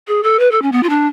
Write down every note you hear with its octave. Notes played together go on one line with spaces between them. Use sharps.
G#4
A4
B4
A4
C#4
B3
F4
D4